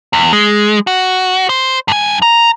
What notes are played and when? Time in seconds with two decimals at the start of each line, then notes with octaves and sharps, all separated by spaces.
0.13 E2
0.33 G#3
0.87 F#4
1.49 C5
1.88 G2 G#5
2.22 A#5